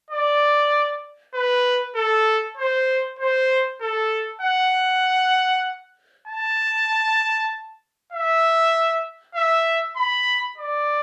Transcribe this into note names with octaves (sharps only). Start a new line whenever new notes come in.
D5
B4
A4
C5
C5
A4
F#5
A5
E5
E5
B5
D5